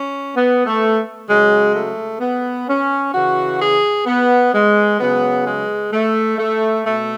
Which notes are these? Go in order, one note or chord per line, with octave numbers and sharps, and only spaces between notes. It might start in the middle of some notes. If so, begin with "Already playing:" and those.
Already playing: C#4
B3
A3
C#3 F#3 G#3
A3
B3
C#4
C#3 E3 F#4
G#4
B3
G#3
C#3 F#3 B3
G#3
A3
A3
B2 A3